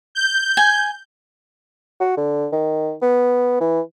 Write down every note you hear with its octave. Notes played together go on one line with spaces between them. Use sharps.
G6
G#5
F#4
D3
D#3
B3
E3